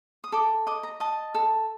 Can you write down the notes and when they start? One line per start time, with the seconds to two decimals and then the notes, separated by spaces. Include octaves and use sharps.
0.24 D#6
0.32 A4 D6
0.67 D#5 D6
0.83 A#5
1.00 D#5 A5
1.34 A4